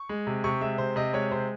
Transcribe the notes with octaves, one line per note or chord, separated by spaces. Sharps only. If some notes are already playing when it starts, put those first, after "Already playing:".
Already playing: C#6
G#3
C3
C3 C#6
G#3 E5
C3 C5
C3 D#5
G#3 C#5
C3 C5